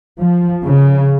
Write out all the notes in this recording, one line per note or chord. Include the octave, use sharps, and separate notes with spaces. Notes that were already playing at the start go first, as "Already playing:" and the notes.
F3
C#3